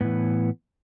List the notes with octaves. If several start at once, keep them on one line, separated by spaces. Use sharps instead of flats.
A2 E3 B3